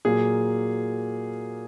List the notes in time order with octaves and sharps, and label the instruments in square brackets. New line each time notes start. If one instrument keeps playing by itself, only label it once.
[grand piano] A#2 F#3 A#3 G#4